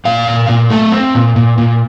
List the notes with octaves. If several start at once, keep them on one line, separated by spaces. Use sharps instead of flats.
A#2 F5
A#2
A#2
A3
C4
A#2
A#2
A#2